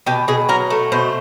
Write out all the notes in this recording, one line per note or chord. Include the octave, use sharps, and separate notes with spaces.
B2 G4
B2 G#4
F#3 A#4
A3
B2 C5